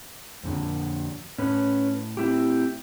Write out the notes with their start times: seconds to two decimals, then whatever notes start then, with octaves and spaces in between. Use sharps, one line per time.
0.43 F2 A#2 D3
1.38 A2 C#4 B4
2.17 C4 E4 G4